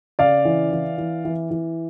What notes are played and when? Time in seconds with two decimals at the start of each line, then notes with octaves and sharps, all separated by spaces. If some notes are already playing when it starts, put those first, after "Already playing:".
0.19 C#3 D5 F5
0.45 E3
0.72 E3
0.98 E3
1.25 E3
1.51 E3